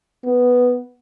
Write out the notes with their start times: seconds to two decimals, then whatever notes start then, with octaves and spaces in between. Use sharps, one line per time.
0.24 B3